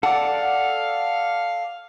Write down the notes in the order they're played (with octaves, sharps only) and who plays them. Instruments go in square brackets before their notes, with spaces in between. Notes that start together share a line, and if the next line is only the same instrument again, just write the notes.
[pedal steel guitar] A4 D5 [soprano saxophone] F5 [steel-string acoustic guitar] F#5